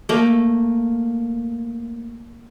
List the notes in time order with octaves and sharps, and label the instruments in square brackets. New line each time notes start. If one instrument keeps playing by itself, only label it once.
[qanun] A3 A#3